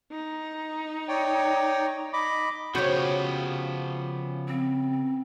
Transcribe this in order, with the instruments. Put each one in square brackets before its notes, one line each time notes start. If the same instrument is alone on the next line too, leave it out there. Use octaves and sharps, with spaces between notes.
[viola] D#4
[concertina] C#5 D5 G5
D#5 B5 D6
[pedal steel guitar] C#3 B3 G6 [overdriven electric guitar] F3 G4 [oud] F#4 C#5
[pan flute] C4